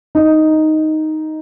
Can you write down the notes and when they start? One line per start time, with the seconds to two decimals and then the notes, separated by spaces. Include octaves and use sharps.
0.15 D#4